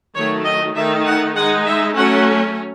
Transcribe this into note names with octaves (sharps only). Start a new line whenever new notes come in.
D#3 F#3 A3 C#5
D#5
D#3 A3 D#4 E5
F#5
G#3 D#4 F#5
E5
F#3 A3 C#4 F#5